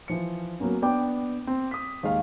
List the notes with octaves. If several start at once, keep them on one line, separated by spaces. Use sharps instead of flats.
E3 F3 C#7
F#3 A#3 B3 C#4
B3 D4 G5 D6
C4
D#6 B6
D#2 G#3 F5